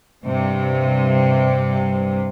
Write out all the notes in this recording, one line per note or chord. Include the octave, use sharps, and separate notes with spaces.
G2 C3